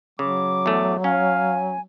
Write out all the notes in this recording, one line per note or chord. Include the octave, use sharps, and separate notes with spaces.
C#3 F#3 D6
E2 A3
C#4 F5 G#5